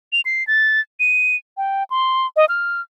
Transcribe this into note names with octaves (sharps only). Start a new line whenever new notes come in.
F7
C7
A6
D#7
G5
C6
D#5
F6